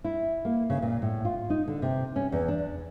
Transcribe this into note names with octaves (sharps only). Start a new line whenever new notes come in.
E4
A#3
C#3
A#2
A2
F4
D#4
D3
C3
C#4
E2
D4